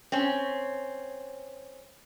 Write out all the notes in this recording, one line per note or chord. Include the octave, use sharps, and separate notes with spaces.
C4 C#4